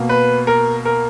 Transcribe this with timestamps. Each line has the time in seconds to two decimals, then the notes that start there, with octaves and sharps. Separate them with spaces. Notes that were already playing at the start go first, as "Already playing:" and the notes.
Already playing: B2 A#3
0.09 B4
0.47 A#4
0.85 A#4